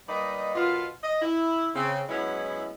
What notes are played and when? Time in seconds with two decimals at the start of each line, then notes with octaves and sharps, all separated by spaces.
0.08 G3 A#3 D#4 B4 D5 D#5
0.55 F#2 B2 B3 F4
1.04 D#5
1.22 E4
1.76 C#3 C4
2.09 F#3 G#3 B3 C#4 E4